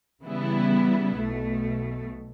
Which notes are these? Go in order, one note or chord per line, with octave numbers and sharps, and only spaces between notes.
C#3 E3 G3 B3 E4
B1 B2 A3